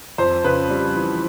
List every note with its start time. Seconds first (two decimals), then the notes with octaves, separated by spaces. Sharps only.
0.18 F2 C5
0.44 C#3 B4
0.70 G3
0.95 E3